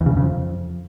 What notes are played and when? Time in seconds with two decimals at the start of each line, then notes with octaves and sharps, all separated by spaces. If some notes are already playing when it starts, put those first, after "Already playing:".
0.01 E2
0.06 C#3
0.11 G2
0.17 C#3
0.22 F2